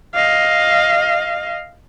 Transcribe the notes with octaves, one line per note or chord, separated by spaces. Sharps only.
D#5 F5